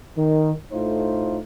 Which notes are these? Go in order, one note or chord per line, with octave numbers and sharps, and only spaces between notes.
D#3
A2 A3 D#4 F4 C5